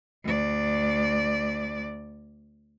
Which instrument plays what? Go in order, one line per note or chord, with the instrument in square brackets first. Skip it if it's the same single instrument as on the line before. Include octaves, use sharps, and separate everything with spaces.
[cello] D2 D5